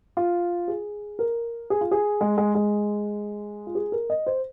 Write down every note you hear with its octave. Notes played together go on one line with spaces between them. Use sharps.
F4
G#4
A#4
G#4
F4
G#4
G#3
G#3
G#3
F4
G#4
A#4
D#5
C5